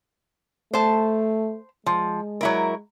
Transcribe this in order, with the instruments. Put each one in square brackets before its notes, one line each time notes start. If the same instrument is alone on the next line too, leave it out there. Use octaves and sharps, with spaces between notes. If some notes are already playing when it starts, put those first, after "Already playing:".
[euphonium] A3 [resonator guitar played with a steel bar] C5 A5
[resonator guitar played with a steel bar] F3 [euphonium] G#3
[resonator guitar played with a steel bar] F#3 E4 A#4